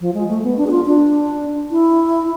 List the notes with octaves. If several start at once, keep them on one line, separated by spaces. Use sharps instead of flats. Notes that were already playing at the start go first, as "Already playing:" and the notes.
F3
G#3
A3
B3
D4
G#4
F4
D4
E4